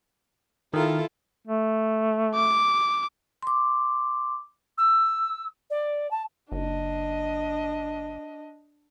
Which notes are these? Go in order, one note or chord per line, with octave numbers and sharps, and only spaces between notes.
D#3 E4 F4 A4 A#4
A3
D6
C6 D6
E6
D5
A5
F#1 D4 D#5